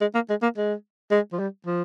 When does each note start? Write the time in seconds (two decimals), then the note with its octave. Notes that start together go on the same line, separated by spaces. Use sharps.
0.01 G#3
0.15 A#3
0.30 G#3
0.43 A#3
0.57 G#3
1.11 G#3
1.32 F3
1.39 G3
1.66 F3